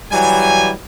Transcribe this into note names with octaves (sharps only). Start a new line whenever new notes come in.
E3 F#3 G3 G#5